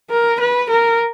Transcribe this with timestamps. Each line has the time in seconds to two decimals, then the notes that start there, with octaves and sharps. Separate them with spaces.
0.11 A#4
0.40 B4
0.70 A#4